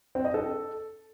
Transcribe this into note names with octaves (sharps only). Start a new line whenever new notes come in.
C4
D#5
A4